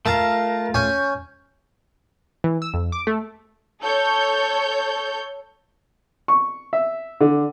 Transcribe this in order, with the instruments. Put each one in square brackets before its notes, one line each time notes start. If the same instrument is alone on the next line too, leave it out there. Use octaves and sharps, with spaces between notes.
[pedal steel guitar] A3 F4 F5 [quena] A#4 [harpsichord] A5 A#5
[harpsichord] C#4 G#5 [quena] G6
[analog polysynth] E3
E6
F2
D6
A3
[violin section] A4 C#5 G6
[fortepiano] C#6
E5
D3